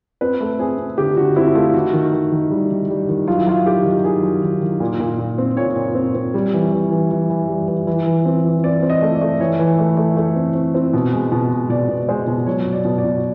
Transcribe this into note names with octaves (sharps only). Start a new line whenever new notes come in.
C4 B4
A3
C4 G#4
C4
D3 G4
D3 F#4
C4 E4
A3 F4
D#3 F#4
D#3
D#3
D#3
G3
D#3
G3
D#3
F#3 F4
E4
F#3 F4
D#3 G4
D#3
D#3 G#4
F#3
D#3
D#3
A#2
A#2
A#2
C4
A#2 C#5
A#2
C4
C4
G3
E3
E3
E3
E3
E3
G3
E3
E3
E3
C4
E3
C4 D5
C4
D#5
A3
D5
A3
E3 C#5
E3
A3
A3
A3
C4
C4
C4
B2
G#3
B2
G#3
B2 D5
B2
G#3 C5
B2
F#3 C#5
B2
D5
B2
D5
B2